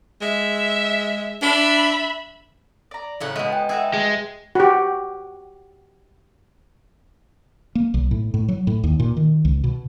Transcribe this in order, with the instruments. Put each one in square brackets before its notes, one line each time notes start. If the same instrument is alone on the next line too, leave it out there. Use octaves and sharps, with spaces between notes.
[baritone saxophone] G#3 [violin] E5
[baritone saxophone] D4 [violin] E5 B5
[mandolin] D5 A#5
[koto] A2 C#3 F#5
[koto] B2 G#3 [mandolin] A3 B3
[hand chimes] G5
[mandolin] E4 F#4 A4 [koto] G#4
[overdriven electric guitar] G#3
[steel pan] F#4 G4
[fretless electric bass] A#3
B1
A2
A2
F#3
A2
D#2
A#2
D#3
C#2
B2